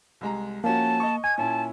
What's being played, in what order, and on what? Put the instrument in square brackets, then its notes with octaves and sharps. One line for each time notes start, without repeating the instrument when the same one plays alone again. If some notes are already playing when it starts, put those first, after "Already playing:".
[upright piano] C2 G#3 A#5
[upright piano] F3 C#4 F#4 [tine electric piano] A#3 [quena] A5
[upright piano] D#5 C#6
[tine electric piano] G#5 [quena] G#6
[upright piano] A#2 C#4 E4 [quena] A5